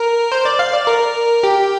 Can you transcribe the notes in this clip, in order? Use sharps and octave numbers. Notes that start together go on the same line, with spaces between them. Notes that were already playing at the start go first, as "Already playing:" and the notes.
Already playing: A#4
C5
D5
F5
D5
A#4
G4